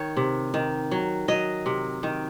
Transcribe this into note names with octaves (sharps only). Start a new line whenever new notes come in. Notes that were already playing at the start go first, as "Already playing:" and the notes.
Already playing: D#3 C#5
C3
D#3
F#3
F#3 D#5
C3
D#3